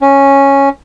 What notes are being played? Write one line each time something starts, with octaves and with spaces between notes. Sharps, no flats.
C#4